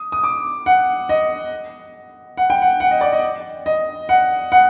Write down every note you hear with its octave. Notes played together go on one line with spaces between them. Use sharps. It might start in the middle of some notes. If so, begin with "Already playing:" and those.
Already playing: D#6
D#6
D6
F#5
D#5
F#5
G5
F#5
F#5
D#5
D5
D#5
D#5
F#5
F#5